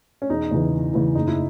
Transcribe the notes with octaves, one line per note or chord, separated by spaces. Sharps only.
C#4
E1 D#4
E2 C#3 E3
E1
E2 C#3 E3
F#1 D#4
E4